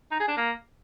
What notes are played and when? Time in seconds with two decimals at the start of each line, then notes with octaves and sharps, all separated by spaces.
0.11 D#4
0.20 G#4
0.28 D4
0.37 A#3